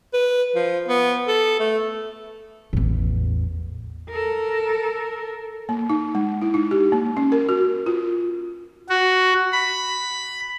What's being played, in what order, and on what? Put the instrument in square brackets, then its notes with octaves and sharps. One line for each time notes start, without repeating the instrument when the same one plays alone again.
[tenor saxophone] B4
F3
B3
A4
A3
[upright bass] A1 E2
[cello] A4 A#4
[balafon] A#3
D#4
G#3
E4
D#4
G4
A#3
C#4
A#4
F#4
F4
[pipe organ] F#4
B5